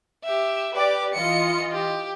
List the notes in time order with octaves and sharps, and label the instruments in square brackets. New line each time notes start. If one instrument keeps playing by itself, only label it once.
[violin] G4 E5
[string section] G4 D5 [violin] B4 D6
[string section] E3 F4 D#5 [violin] C#7
[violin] G4